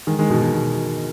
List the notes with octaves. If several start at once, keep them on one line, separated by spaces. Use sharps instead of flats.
D#3 G#3
D#3 G#3
B2 D#3
B2
B2